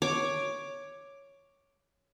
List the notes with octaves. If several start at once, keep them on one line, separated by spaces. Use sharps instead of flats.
C#5 D6